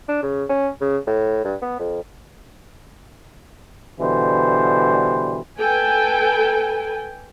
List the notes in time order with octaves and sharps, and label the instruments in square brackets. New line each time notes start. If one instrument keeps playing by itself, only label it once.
[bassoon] D4
C#3
C#4
C#3
A2
G2
B3
F2
[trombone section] B2 D3 E3 G3 C5
[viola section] A4 B4 G5 G#5